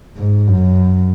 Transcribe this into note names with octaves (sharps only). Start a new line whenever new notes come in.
G#2
F#2